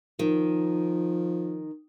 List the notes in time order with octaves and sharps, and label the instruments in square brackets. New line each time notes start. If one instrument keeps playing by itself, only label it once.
[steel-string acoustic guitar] D#3 [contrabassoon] F3